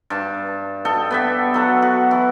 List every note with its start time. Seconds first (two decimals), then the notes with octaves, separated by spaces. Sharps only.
0.10 G2 A5
0.85 A4 D#5 G5
1.11 B3 G4 E5
1.54 F#3 A4 F#5
1.82 F#4
2.11 E3